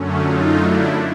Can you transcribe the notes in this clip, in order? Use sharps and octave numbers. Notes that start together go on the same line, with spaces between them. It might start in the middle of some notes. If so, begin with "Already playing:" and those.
Already playing: F#2 D3 F#3 A3 C#4
D#4 F4
D4 E4